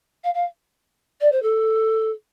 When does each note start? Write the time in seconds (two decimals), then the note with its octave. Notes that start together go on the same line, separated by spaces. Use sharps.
0.23 F5
0.34 F5
1.21 D5
1.32 C5
1.42 A4